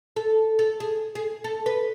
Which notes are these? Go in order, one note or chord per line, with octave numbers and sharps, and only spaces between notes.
A4
A4
G#4
G#4
A4
B4